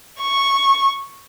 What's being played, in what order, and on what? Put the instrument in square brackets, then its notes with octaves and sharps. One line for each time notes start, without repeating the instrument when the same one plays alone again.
[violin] C#6